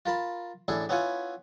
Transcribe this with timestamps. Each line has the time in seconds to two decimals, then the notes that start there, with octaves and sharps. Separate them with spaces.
0.06 F4 A#4 A5 B5
0.68 A1 D4 E4 G#4 A4
0.89 B3 C#4 E4 F4 F#5 G#5